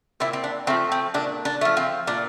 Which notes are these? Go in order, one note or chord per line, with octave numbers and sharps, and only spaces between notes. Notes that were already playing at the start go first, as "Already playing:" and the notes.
A#2 C4 E4
C4
D4
F3 A3 C4
C4
A#2 D4
D4
F3 A3
C4
A#2 D4